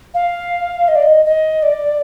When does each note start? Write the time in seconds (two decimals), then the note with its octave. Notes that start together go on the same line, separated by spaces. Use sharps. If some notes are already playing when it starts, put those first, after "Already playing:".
0.14 F5
0.88 D#5
0.95 D5
1.02 D#5
1.25 D#5
1.63 D5